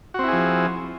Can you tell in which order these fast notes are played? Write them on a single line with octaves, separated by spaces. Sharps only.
F#4 C4 E4 G#4 F3